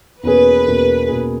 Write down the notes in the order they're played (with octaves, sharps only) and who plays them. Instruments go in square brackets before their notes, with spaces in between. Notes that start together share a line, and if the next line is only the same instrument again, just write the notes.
[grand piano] E2 B2 A#3 C#4 G#4 [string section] B4
[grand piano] E2 B2 A#3 C#4 G#4
E2 B2 A#3 C#4 G#4